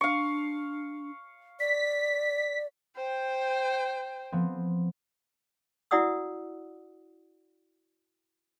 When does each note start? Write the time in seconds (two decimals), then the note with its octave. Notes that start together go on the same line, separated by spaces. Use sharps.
0.01 D4 F5 C#6
1.60 D5 B6
2.96 C5 G5
4.32 F3 B3 C4
5.91 E4 F#4 D5 F#5 D#6 E6